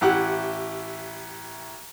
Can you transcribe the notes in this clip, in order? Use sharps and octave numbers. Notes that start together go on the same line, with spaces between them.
A1 E4 G4 F#5 F#6